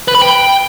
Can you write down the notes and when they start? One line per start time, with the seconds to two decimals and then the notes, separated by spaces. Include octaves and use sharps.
0.08 B4
0.15 B5
0.21 G5